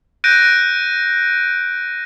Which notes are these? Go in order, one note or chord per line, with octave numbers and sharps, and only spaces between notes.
F#6 G6 A#6 D7 D#7